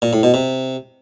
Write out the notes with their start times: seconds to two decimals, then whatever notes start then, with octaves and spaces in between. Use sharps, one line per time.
0.02 A#2
0.13 A2
0.23 B2
0.34 C3